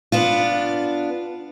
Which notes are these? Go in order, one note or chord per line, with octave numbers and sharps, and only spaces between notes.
B3 D4 F4